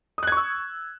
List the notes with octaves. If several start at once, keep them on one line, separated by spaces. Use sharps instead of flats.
C#6 D#6 E6 F#6 G#6